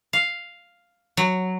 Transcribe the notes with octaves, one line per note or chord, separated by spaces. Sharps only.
F5
F#3